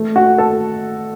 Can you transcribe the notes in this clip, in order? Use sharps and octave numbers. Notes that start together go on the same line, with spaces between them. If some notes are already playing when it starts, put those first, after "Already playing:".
Already playing: A3
F#4
A4